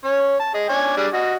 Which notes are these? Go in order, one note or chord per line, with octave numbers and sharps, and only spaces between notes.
C#4 C#5
A5
G#4 D#5
D4 C#5 G#5
G3 D4 G#4
F#4 D#5